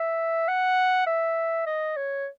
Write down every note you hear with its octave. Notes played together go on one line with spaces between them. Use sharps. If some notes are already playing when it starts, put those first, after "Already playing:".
Already playing: E5
F#5
E5
D#5
C#5